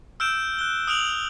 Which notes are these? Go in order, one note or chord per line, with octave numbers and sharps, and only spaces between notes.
E6 F6 G6 D7 E7
F#6 G7
D#6 F6 D7 F7 F#7